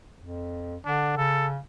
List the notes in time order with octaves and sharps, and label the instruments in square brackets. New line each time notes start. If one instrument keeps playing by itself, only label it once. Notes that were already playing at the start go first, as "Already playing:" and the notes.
[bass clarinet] F2
[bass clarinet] D3 [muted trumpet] D4
[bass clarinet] C#3 [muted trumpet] A4